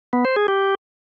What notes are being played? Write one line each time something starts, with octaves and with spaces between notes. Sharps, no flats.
B3
C5
G#4
G4